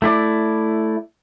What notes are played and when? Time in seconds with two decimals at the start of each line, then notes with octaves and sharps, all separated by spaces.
0.02 A3 E4 D5